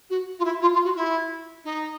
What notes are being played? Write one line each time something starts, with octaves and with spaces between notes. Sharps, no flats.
F#4
F4
E4
F4
F4
F#4
E4
D#4